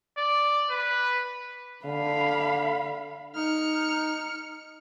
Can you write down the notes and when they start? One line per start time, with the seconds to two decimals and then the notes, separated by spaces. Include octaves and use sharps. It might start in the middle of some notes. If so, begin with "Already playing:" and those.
0.17 D5
0.70 B4
1.85 D3 F5 B5
3.35 D#4 F6 C#7